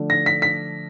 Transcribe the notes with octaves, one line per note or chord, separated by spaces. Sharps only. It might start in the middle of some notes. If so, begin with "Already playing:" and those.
Already playing: D3 F3 A3 D4
A#6
B6
B6